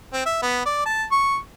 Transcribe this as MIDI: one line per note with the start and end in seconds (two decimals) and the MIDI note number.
0.13 0.25 60
0.26 0.42 76
0.42 0.61 59
0.65 0.84 74
0.85 1.04 81
1.12 1.38 85